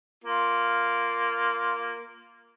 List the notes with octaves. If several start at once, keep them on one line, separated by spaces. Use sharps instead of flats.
A#3 F4